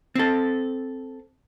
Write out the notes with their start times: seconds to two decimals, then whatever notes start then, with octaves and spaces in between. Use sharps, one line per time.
0.15 C4 A4